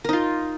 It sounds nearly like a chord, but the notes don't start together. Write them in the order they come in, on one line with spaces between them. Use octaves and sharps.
A#4 D#4 F4